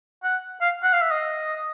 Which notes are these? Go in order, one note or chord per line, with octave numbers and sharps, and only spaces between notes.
F#5
F5
F#5
F5
E5
D#5